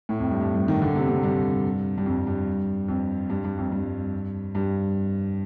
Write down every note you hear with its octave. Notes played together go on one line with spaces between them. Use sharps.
A2
F2
G2
G2
G2
D#3
D3
C3
C3
G2
G2
F2
G2
F2
G2
G2
F2
G2
G2